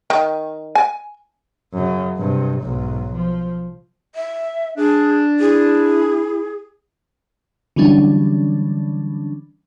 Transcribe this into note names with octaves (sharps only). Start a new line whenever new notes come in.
D#3
G#5
F#2 C#3
G2 C3
B1 G#2
F3
E5
D4 G#4
E4 G#4
D3 E3 F#3 G3 C#4 D4